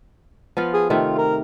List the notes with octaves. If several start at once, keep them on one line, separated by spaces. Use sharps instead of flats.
F3 B3 F4
G#4
C3 D#3 A3 F4
A#4